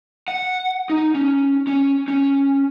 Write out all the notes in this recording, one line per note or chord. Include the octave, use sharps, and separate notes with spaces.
F#5
D#4
C#4
C#4
C#4